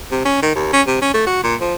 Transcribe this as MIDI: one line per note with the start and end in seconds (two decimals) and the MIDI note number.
0.11 0.21 48
0.25 0.40 61
0.42 0.51 51
0.55 0.69 39
0.73 0.82 61
0.87 0.97 48
1.02 1.11 61
1.14 1.23 57
1.26 1.41 66
1.44 1.55 46
1.61 1.75 53